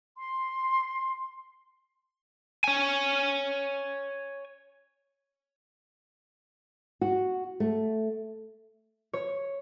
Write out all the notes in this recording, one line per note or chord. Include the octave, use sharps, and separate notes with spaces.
C6
C#5 G#5
F#4
A3
C#5